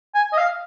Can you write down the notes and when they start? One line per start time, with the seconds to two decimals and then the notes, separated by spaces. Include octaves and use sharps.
0.14 G#5
0.33 D#5
0.37 F5